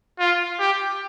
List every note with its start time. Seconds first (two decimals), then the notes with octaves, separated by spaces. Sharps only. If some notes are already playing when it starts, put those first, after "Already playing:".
0.19 F4
0.60 G4